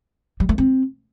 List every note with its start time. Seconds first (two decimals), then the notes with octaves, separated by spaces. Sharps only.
0.40 G3
0.49 A3
0.58 C4